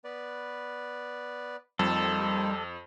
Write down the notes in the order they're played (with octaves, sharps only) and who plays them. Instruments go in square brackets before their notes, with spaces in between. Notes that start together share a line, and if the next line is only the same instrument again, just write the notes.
[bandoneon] B3 B4 D5
[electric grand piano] F2 [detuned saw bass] G3 [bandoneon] A#3 D#4 C5 [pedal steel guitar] A4